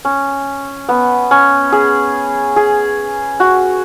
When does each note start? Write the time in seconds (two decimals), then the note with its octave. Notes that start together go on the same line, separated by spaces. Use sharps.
0.05 C#4
0.89 B3
1.31 C#4
1.72 G#4
2.56 G#4
3.40 F#4